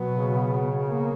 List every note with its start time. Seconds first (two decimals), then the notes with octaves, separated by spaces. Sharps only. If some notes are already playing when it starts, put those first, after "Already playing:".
Already playing: B2 F#3 B3
0.11 C#3
0.85 A#3